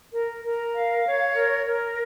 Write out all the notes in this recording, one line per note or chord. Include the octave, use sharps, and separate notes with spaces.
A#4
A#4
F5
C#5
A#4
A#4